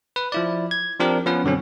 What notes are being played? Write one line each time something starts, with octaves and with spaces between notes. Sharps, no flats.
B4
F3 E4 D5
G#6
F3 C4 D4 G4 A#4
F3 B3 C#4 B4
F#2 B2 D3 F#3 C4 C#4